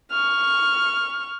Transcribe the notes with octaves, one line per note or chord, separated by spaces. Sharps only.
C#6 F6